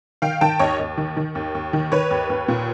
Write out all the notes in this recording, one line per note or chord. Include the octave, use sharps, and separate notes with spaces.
D#3 F5 G5
D#3 G5 A5
D#2 C#5 D#5
D#2
D#3
D#3
D#2
D#2
D#3
D#3 B4 C#5
D#2
D#2
A#2